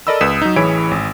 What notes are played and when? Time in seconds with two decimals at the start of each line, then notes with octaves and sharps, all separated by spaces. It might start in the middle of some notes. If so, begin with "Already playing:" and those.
0.07 A4 A#4 D5 D#5 B5 E6
0.21 C#2 B4 D#6 B6 E7
0.42 F#3 D#4
0.56 A1 E3 G#4 C#5 B5 D7
0.91 G#1